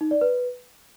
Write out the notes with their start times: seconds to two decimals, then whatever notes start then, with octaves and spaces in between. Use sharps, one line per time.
0.01 D#4
0.11 D5
0.21 B4